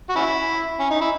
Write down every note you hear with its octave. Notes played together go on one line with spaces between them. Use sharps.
F#4
C#4 E4
C#4
D#4
E4